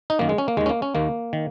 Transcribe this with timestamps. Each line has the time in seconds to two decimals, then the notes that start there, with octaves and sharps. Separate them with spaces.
0.10 D#4
0.19 F#2 D#3 A#3
0.29 G#3
0.38 C#4
0.48 A#3
0.57 D#2 D#3 G#3
0.66 C#4
0.69 A#3
0.82 C#4
0.95 D#2 D#3 A#3
1.33 D#3